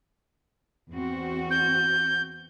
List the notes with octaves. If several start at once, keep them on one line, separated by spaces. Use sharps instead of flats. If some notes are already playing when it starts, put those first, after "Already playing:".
E2 C4 F#4
G6